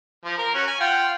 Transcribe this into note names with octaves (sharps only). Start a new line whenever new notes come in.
F3
A#4
C#4 F#4
G#5
F4 F#5 G5